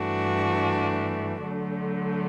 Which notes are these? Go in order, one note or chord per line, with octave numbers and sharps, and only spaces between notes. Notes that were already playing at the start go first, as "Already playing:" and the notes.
Already playing: G2 E3 A3 D4 F#4
D3 F#3 A3